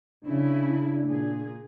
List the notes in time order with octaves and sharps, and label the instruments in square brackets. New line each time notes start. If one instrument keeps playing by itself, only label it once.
[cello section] C#3 E4 [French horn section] D4
[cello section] A#2 G#4